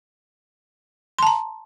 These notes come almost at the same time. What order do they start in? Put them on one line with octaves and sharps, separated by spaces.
C6 A5 A#5